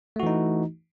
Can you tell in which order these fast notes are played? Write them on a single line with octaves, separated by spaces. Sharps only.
A3 F#4 E3 D#4